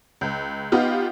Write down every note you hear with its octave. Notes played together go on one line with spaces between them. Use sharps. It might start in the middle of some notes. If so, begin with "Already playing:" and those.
C#2
B3 D#4 F4 G4